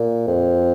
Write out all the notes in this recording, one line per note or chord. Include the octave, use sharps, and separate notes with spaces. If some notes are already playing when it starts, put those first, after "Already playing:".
Already playing: A#2
F2